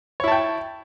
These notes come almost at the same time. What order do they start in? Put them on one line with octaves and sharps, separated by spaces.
C#5 E4 A5 G5